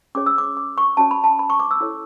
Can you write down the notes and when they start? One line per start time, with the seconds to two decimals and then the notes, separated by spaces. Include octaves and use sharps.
0.15 C#4 G#4 C#5 D6
0.26 E6
0.38 D6
0.57 D6
0.78 C#6
0.97 C#4 F#4 C#5 A5
1.11 B5
1.24 A5
1.39 B5
1.50 C#6
1.60 D6
1.71 E6
1.81 E4 A4 C#5